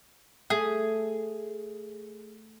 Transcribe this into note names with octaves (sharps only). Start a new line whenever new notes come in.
A3 G#4